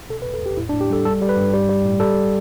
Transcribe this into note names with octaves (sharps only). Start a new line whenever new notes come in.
B2 A4
B4
E2
A4
E2 G4
A2 E4
D4
A2
G4
G3 A4
G3 A4
G3
B4
G2
G3
G3
A2
G3 A4